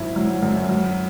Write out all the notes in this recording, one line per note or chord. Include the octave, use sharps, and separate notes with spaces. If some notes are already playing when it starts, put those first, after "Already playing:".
Already playing: G#1 F#2 E4
F#3
F#2
F#3